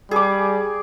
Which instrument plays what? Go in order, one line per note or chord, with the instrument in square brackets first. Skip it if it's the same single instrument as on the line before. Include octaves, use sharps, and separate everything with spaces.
[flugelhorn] G3 [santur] G#4 D6